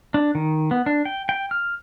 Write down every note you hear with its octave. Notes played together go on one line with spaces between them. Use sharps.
D4
D#3
B3
D4
G5
G5
F6